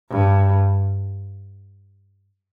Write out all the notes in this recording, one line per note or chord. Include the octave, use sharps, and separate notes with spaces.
G2